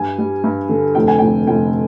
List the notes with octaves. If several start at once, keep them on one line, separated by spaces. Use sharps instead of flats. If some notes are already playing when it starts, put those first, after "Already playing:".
Already playing: G2 G#5
G3
G2
D3
F1 G5
G#5
F1 G5
F1 G5